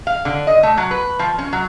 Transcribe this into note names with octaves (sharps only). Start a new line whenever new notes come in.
F5
D3
D#5
A3
F#3
B4
F3
C#4
F#3